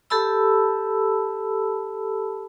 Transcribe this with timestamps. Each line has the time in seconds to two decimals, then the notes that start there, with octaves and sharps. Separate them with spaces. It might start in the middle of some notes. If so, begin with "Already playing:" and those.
0.10 G4 A4 A5 B5 E6